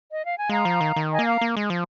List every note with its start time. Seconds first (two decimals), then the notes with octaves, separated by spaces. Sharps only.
0.11 D#5
0.24 F5
0.37 G#5
0.49 G#3 F5 A#5
0.65 F3
0.81 D#3
0.96 D#3
1.11 D#5 G#5
1.19 A#3
1.26 F5 A#5
1.41 A#3
1.57 G#3
1.70 F3